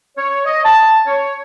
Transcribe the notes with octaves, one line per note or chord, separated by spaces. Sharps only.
C#5
D#5
A5
C#5